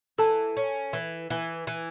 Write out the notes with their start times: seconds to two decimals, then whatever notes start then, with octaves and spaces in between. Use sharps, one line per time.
0.18 E3 A4 A5
0.57 C#4
0.93 E3
1.30 E3
1.67 E3